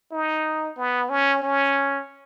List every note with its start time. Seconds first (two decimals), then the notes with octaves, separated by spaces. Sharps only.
0.12 D#4
0.78 B3
1.10 C#4
1.43 C#4